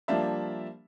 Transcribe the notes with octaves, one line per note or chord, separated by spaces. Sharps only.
F3 G3 A#3 D4 E5